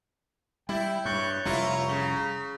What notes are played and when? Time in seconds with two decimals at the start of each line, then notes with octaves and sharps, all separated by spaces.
0.69 G3 E4 G5
1.05 G2 C#5 C#6 F#6 G6
1.45 F1 G3 E4 F4 A#5
1.89 C#3